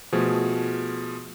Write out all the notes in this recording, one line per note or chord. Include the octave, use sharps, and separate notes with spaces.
B2 F3 A3 G#4